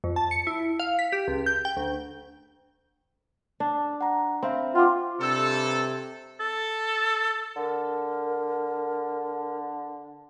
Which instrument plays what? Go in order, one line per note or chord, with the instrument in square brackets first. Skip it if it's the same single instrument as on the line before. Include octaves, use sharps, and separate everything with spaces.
[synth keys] F2
A5
C#7
E4
F5
B6
G4
C#2
G6
G5
D2
[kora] D4
[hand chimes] F#5 A#5
[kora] C4 [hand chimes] E5 F5 B5
[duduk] F4 [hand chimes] F#5 G5 D6
[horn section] G2 A4 [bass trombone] C3
[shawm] A4
[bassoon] D3 [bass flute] A#4